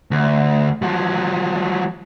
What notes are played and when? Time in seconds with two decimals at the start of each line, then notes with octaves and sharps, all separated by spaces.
0.11 D2
0.82 F3 F#3